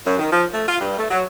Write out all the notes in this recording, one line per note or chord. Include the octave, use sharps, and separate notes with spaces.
F#2
D#3
F3
A3
F4
G2
A3
F#3